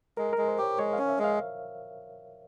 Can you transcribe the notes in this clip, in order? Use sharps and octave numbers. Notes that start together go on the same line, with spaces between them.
G#3 A#4
G#3 A#4
C5
G4 C#5
G#3 C#5
C#4 F5
E5
G#3
F5